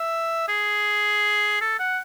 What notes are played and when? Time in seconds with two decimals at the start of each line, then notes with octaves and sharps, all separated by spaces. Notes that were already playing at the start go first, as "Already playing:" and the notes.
Already playing: E5
0.48 G#4
1.61 A4
1.79 F#5